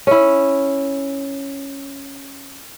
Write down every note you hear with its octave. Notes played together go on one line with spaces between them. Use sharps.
C#4 E4